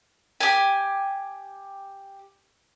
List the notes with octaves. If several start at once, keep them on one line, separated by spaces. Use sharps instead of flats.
G4 G#5